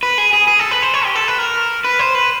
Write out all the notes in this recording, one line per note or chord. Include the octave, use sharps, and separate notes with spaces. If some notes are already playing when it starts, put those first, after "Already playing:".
B4
G#4
G#4
G#4
A4
B4
C5
C#5
G4
A4
B4
A#4
B4
C5
B4